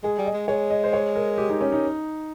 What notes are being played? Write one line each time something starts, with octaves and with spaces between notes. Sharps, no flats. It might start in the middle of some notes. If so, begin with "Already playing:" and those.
G#3 G#4
G3
D#5
G#3
G#3 C#5
D#5
C5
C#5
A#4
G4
D#4
C#4
D#4